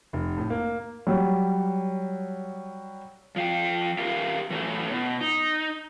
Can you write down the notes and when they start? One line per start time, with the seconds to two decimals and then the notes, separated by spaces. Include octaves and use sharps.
0.13 F1
0.38 A2
0.50 A#3
1.07 F#3 G3
3.36 F3 F5 G5
3.99 G4 A#4 E5 F5
4.50 E3 F#3 A3 E4
4.91 B2
5.21 D#4